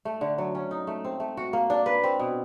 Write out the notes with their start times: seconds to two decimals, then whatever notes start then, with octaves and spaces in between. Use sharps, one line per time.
0.05 A3
0.21 D3
0.38 F#3
0.55 C#4
0.71 D#4
0.87 A3
1.05 C4
1.20 A3
1.37 F#4
1.53 A#3
1.70 D4
1.86 B4
2.04 C4
2.20 B2